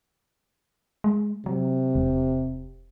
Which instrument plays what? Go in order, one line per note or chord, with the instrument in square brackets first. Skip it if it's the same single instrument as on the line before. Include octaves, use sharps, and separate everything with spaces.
[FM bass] G#3
[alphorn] C3 [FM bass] F#3
[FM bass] E1